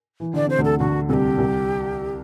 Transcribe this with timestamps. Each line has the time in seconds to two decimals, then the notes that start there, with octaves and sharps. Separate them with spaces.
0.20 E3
0.34 D3 D5
0.46 C3 C5
0.58 D2 D3
0.65 A4
0.79 D2 D3 F#4
1.09 C2 C3 G4 A4
1.38 C2 C3